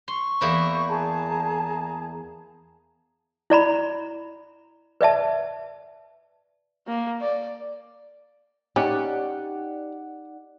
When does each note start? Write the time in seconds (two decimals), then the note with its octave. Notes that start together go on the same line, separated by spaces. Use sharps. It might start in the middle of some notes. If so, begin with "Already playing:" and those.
0.08 C6 C#6
0.41 E2 A#3 E4
0.88 G#4 A5 A#5
3.50 E4 D5 A#5 B5
5.01 B4 D5 E5 A5
6.87 A#3
7.22 D5
8.76 C#4 D#4 G4 D5 F#5